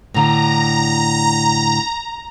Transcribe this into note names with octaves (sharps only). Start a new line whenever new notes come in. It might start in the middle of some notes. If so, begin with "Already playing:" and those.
A2 D3 A#5